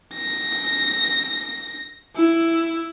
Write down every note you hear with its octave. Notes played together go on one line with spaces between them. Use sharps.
A#6
E4